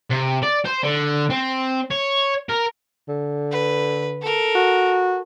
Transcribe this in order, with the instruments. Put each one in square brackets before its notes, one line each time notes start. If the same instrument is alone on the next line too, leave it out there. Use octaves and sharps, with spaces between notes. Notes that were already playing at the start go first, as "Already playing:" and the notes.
[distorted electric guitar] C3
D5
C5
D3
C4
C#5
A#4
[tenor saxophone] D3
[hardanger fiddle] B4
A4 A#4
[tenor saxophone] F#4